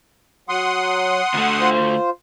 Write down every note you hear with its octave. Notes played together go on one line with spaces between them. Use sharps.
F#3 F#5 C6 D#6
D2 A3
F4 C5